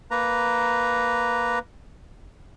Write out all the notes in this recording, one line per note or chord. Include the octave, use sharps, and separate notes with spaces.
A#3 B4 A#5